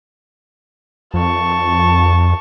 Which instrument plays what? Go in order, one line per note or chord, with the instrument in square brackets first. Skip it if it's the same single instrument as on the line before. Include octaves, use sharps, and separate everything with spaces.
[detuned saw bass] F2 [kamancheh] A5 C#6